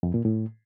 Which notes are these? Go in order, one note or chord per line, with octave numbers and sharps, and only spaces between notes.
F2
A#2
A2